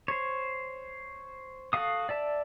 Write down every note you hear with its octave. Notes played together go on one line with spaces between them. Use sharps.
C5 C#5
F#4 A4 F5 D#6
D5 E5 A5